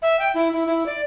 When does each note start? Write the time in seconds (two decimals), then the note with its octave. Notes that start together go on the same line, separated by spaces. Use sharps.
0.02 E5
0.19 G5
0.34 E4
0.53 E4
0.66 E4
0.86 D5